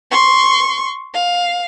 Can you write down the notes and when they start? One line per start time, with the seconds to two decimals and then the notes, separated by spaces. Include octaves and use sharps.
0.11 C6 C#6
1.14 F5